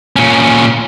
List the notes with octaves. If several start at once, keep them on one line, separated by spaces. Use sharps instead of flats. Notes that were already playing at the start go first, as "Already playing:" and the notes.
A#2 C#4